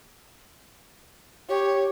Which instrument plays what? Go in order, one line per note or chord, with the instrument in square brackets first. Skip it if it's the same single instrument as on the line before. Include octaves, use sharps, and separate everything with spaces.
[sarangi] G4 [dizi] C#5